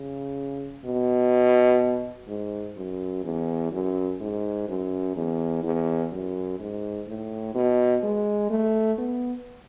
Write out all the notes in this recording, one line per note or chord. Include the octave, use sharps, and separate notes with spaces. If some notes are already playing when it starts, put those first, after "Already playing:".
Already playing: C#3
B2
G#2
F#2
E2
F#2
G#2
F#2
E2
E2
F#2
G#2
A2
B2
G#3
A3
B3